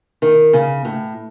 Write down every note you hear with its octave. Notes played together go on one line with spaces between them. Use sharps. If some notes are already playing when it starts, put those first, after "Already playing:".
D#3
C#3
A2